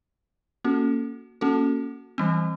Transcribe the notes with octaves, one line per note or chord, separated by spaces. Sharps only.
A#3 C#4 F#4 A4
A#3 C#4 F#4 A4
E3 G3 C4